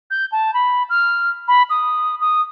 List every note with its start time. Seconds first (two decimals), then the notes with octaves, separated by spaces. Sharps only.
0.10 G6
0.32 A5
0.54 B5
0.90 F6
1.48 B5
1.70 D#6
2.21 D#6